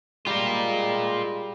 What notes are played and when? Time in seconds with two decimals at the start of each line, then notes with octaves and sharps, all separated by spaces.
0.27 G3 G#3 F4 A#4